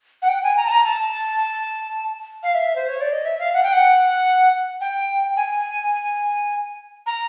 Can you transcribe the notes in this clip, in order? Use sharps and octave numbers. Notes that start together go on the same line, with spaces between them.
F#5
G5
G#5
A#5
A5
A#5
A5
F5
E5
C5
C#5
D5
D#5
E5
F5
F#5
G5
F#5
G5
G#5
A#5